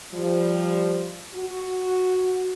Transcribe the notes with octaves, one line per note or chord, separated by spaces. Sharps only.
F3 G3
F#4